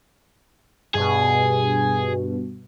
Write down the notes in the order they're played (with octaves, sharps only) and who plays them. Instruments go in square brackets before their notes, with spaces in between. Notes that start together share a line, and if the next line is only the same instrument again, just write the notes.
[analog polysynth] G2 B2 [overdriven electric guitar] G#4